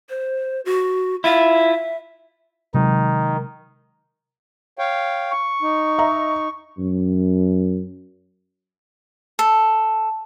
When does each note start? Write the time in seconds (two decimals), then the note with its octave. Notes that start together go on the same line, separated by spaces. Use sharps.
0.10 C5
0.65 F#4
1.24 E4 F4 E5
2.74 C3 D#3 F#3 G#3 D#4
4.79 C#5 F5 G5
5.31 C#6
5.62 D#4
5.98 D#5 E5 A#5
6.78 F#2
9.39 A4